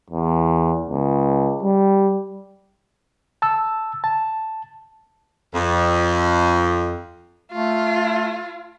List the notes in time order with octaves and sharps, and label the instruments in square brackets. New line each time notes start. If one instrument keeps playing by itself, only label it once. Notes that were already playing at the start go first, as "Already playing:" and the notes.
[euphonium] E2
C#2
G3
[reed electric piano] A5 E6
A5
[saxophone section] F2
[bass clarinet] A3 [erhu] F4